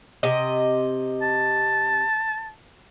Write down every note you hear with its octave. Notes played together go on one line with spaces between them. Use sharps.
C3 D#5
A5